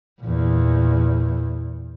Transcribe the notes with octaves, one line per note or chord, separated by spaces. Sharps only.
E2 A#2